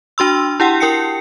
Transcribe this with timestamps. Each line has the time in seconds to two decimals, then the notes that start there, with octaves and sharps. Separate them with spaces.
0.18 D4 F#4 C6 E6
0.60 E4 G4 F#5 G5
0.80 E4 A#4 G5 C7 C#7